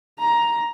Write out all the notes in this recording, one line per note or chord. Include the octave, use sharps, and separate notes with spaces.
A#5